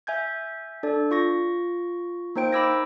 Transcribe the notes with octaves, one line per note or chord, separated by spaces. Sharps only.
E5 G#5 G6 G#6
D4 A4 D5
F4 C#6 A#6
A#3 D#4 C5 G5 D7
D#4 B5 D6 E6 G#6 A#6